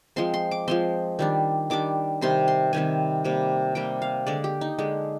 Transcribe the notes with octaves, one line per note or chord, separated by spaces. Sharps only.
F3 G#3 C4 C6
C6
D6
F3 G#3 C4 C6
D#3 G3 D4
D#3 G3 D4 D6
C3 D#3 G3 C4 C6
C6
C3 D#3 G3 C4 G#5
C3 G3 A#3
C3 G3 A#3 G5
F5
D3 G#3 D4 D5
G4
D#4
D3 G#3 D4